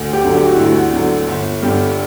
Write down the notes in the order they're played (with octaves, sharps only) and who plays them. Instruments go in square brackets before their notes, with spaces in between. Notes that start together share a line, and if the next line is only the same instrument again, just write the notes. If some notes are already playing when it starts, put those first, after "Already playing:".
Already playing: [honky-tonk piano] D2
[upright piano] G4
[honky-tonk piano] D3 F#3
[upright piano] G4
F#4
[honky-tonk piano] D2 [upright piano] E4
[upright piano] F#4
[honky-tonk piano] D3 F#3
G1
[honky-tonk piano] G2 D3 [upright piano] G4